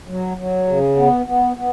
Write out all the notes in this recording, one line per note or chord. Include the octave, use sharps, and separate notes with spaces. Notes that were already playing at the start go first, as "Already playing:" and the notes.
F#3
F#3
C#3
B3
B3
B3